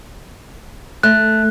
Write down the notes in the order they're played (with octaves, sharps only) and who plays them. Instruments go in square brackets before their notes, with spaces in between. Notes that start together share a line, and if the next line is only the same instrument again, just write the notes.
[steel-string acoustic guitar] A3 [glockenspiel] F#6